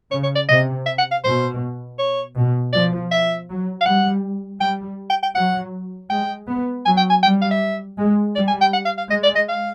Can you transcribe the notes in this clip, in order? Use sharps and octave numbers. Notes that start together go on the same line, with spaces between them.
C#3 C#5
C#5
D5
C3 D#5
E5
F#5
F5
B2 C5
C#5
B2
F3 D5
E5
F#3
F5
G3 F#5
G3 G5
G5
G5
F#3 F#5
G#3 G5
B3
F#3 G#5
G5
G#5
G3 G5
F5
E5
G#3
G3 D5
G#5
G5
F#5
F5
F5
G#3 D#5
D5
D#5
F5